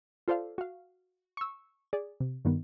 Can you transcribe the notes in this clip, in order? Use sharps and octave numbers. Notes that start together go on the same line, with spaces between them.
F4 A4 C5 D5 F5
F#4 F5
C#6 E6
G#4 D5
C3
G2 D#3 B3